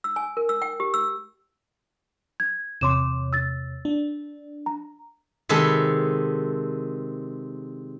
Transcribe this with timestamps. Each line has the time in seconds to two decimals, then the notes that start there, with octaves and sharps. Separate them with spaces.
0.04 E6
0.16 G#5
0.37 A#4
0.49 E6
0.62 G5
0.80 G4
0.94 E6
2.40 G#6
2.81 E2 C3 C#5 C6 D6 E7
3.33 E6 A6
3.85 D4
4.66 A#5
5.49 C3 D#3 G#3 A4 B5